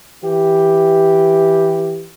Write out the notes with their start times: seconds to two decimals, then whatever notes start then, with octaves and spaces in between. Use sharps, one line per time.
0.23 E3 G4